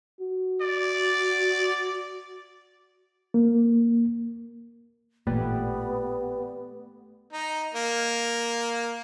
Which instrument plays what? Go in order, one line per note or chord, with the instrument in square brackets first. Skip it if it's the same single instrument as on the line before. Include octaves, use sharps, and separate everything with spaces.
[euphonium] F#4
[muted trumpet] D5
[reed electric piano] A#3
[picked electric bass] A1 A#2 [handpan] A3 [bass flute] B3 [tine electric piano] G4 B4 D5
[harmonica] D#4
A#3